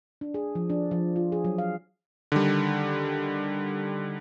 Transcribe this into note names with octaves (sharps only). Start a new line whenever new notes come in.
D4
G#4
F3
D4
F3
F4
G#4
F#3
F5
D3 D#3 G3